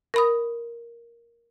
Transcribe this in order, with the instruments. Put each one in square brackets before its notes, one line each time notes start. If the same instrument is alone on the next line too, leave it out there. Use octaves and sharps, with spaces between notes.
[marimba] A#4 B5 D#6